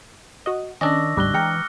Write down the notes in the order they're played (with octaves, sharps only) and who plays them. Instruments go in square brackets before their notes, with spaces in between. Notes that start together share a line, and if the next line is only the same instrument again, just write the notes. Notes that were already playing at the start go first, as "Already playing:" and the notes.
[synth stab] F#4 D#5
[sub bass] D#3 [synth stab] C#4 [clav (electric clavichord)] D4 D5 D#5 [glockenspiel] C#6 E6 A#6
[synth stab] G1 D2 G3 [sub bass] G#2 [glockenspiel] D6 F#6 G7
[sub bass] E3 [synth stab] G#3 G5 A#5 [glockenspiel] F6 F#6 C#7